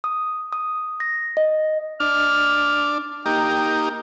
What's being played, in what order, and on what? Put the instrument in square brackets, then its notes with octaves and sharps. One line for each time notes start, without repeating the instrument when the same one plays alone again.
[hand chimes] D#6
D#6
A#6
D#5
[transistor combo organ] D4 [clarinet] F6
[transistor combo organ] A#3 D#4 G4 [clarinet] G5